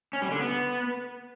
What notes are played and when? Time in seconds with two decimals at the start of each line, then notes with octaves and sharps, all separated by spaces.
0.13 C#4
0.22 G3
0.31 D3
0.40 B3